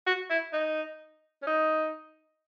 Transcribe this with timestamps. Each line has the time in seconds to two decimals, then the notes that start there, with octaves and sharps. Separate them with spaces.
0.07 F#4
0.30 E4
0.53 D#4
1.43 C#4
1.47 D#4